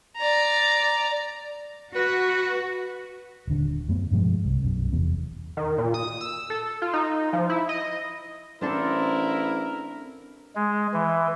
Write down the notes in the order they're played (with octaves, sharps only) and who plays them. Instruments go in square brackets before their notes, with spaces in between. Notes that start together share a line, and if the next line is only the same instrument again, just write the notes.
[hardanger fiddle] D5 A#5
[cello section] F#4 [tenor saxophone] B4
[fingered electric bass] D#1 D3
F#2 A3 B3
G2 B2 F3 G#3
C2
B1 F#2
F1 E2 B3
[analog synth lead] D#3
A#2
D#6
E6
A4
F4
D#4
F3
E4
D#5
[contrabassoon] A1 [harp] C4 D4 A4 [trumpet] E4 [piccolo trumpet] A#4
[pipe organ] G#3
E3